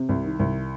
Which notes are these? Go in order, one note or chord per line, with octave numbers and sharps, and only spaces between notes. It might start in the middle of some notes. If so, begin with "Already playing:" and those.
Already playing: C3
C2
D#3
C2